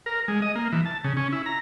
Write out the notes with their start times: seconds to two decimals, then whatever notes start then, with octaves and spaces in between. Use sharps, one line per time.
0.06 A#4
0.28 G#3
0.42 D#5
0.55 A#3
0.72 E3
0.86 A5
1.04 C#3
1.17 C#4
1.32 E4
1.46 A#5